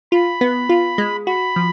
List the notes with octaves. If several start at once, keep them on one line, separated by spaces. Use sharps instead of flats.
F4 B5
B3
F4
G#3
F#4 B5
F3